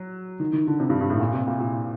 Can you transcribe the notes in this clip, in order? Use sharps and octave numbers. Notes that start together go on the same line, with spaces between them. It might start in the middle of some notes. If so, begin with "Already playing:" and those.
Already playing: F#3
D#3
D#3
D3
C3
G2
G2
A2
A#2
C3
A#2
A#2